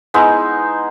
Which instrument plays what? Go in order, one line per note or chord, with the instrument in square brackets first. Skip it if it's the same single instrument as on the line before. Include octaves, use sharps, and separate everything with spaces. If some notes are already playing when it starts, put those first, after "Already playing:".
[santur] G#3 B3 D#4 E4